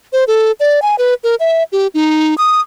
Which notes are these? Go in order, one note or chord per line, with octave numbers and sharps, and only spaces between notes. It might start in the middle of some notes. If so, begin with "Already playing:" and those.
C5
A4
D5
G#5
B4
A#4
E5
G4
D#4
D#6